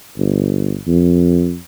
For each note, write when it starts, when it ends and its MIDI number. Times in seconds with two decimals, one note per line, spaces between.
0.18 0.77 31
0.87 1.58 41